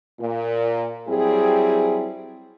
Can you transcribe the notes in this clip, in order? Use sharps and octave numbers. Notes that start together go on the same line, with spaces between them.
A#2
F#3 G3 C4 E4 G#4